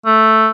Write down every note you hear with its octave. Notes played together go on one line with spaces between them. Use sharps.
A3